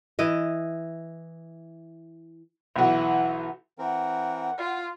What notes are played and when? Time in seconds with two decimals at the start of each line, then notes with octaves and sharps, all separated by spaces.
0.19 E3 D#5
2.76 B1 E3 F#4
3.79 E3 C4 A#4 F#5
4.57 F4